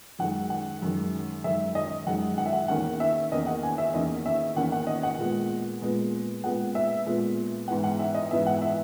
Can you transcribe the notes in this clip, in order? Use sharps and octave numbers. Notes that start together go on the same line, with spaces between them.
F#2 D#3 G#3 F#5
F#5
F#2 D#3 G#3
F#2 D#3 G#3 E5
D#5
F#2 D#3 G#3 F#5
F#5
E5
F#5
E2 D#3 A#3 C#4 F#5
E5
E2 D#3 A#3 C#4 D#5
F#5
G#5
E5
E2 D#3 A#3 C#4 D#5
E5
E2 D#3 A#3 C#4 F#5
F#5
D#5
F#5
A#2 G#3 B3
A#2 G#3 B3
A#2 G#3 B3 F#5
E5
A#2 G#3 B3
G#2 E3 B3 F#5
F#5
E5
D#5
G#2 E3 B3 E5
F#5
E5